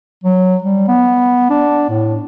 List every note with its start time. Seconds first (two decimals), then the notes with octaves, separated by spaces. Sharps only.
0.24 F#3
0.64 G3
0.88 B3
1.50 D4
1.89 A2